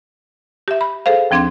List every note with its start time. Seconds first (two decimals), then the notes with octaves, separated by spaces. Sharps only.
0.68 G4 E5
0.81 B5
1.06 G#4 A4 C5 F5
1.31 D#2 F3 C4 D4 C6 G#6